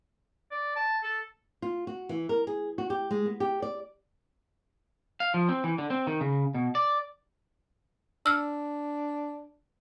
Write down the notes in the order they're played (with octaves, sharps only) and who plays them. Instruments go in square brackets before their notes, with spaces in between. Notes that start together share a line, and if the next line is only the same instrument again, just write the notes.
[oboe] D5
A5
A4
[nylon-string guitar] F4
F#4
E3
A#4
G#4
F#4
G4
G#3
B3
G4
D5
[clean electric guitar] F5
F3
C4
E3
D3
C4
D#3
C#3
B2
D5
[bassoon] D4 [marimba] E6 F6